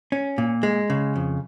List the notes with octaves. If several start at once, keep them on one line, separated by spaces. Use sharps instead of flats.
C#4
A#2
G#3
C#3
F2